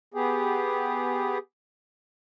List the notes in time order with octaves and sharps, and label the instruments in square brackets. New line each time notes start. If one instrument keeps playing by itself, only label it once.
[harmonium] B3 G4 G#4